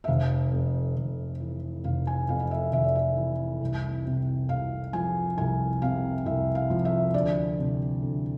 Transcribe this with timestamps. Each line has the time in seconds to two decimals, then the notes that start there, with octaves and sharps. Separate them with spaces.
0.04 E5
0.08 F1 F5
0.52 F2
0.96 F1
1.40 E3
1.84 F1 F5
2.07 G#5
2.29 F2 F5
2.40 F5
2.51 E5
2.73 F1 E5
2.84 D5
2.95 E5
3.17 E3
3.61 C2
4.05 C3
4.49 C2 F5
4.93 F3 G#5
5.38 C2 G#5
5.82 C3 F5
6.26 C2 E5
6.55 F5
6.70 F3
6.85 E5
7.14 D2 D5
7.58 C3
8.02 D2